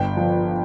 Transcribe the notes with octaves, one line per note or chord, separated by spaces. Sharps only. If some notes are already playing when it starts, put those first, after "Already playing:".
Already playing: G1 G5
F3